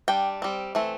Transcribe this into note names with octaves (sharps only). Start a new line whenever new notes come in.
G3 D4 G5
G3 C4
E3 A3 C4